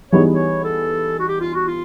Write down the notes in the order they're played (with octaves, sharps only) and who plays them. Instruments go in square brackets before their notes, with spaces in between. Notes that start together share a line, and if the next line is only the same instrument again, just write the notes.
[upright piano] E3 G3 B3 D#4 G#4 [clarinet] C#5
[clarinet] C#5
A4
F#4
G4
F4
F#4
F4